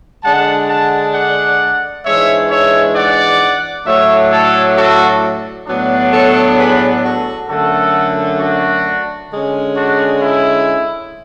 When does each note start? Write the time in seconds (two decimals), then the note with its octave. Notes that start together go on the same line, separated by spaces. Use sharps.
0.24 D3 G#3 D4 F#5 A5
0.69 F#5 A5
1.15 D5 F#5
2.05 G#2 E3 G#3 D4 C#5 E5
2.51 C#5 E5
2.96 D5 F#5
3.87 A2 F#3 A3 D4 C#5 E5
4.31 A4 C#5
4.77 F#4 A4
5.67 A2 F#3 B3 D4
6.13 A4 C#5
6.58 G#4 B4
7.04 F#4 A4
7.49 F#2 D3 A3 F#4 A4
8.39 D4 F#4
9.30 D3 G#3 C#4
9.75 D4 F#4
10.21 E4